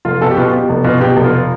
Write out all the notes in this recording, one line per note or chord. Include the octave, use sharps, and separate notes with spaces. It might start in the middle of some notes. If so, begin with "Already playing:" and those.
F1 F4
B2 A4
G4
B2 F4
B2 G4
F1
B2 F4
B2 G4
F1
F4